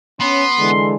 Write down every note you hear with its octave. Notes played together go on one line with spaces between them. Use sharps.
B3 C#4 C6
D3 E3 G#3